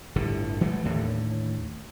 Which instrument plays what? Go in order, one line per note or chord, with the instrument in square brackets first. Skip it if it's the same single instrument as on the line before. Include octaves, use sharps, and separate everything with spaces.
[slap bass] G1 A2 D3
E3 F#3 G3 A3
D#2 A2 D3